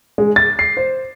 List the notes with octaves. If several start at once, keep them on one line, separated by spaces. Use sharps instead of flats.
G#3
A6
C7
C5